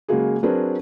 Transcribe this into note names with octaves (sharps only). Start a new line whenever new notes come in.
C#3 F#3 G#3 A#3 F#4 G#4
F#3 C4 D4 G#4 A#4 B4